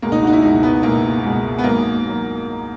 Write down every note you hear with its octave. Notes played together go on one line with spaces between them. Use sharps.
C#2 B2 G#3 A#3
D#4
F#4
D#4
E4
C#2 B2 G#3 D#4
B3
C#2 B2 G#3 A#3
C#2 B2 G#3
B3
G#2 F#3 A#3
F#3